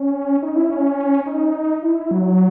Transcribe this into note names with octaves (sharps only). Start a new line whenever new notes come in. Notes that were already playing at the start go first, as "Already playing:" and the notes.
Already playing: C#4
D#4
E4
C#4
D#4
E4
F#3